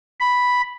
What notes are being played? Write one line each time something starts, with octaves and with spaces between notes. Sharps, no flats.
B5